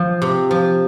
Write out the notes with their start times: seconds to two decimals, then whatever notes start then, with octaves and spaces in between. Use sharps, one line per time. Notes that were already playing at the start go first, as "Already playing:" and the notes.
Already playing: F3 F5
0.22 C3
0.51 F3